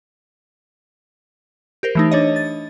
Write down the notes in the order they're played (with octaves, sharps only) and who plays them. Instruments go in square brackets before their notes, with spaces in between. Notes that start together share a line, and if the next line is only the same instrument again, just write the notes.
[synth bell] G4 A#4 C5
E3 A3 D#4
D4 C#5 D#5
A6